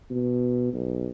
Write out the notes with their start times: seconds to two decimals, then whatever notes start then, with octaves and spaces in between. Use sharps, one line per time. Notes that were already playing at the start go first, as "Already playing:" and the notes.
0.10 B2
0.73 B1